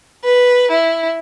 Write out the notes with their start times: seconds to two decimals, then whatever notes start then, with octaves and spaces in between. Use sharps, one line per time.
0.25 B4
0.71 E4